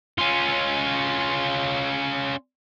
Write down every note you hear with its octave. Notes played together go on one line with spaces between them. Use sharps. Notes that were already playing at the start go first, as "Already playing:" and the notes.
C#4 F4